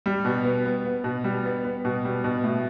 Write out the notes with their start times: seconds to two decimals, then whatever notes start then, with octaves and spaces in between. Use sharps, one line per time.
0.06 G3
0.25 B2
0.44 B3
0.65 B3
0.85 B3
1.04 B2
1.24 G3
1.45 B3
1.65 B3
1.85 B2
2.05 G3
2.24 B2
2.44 A2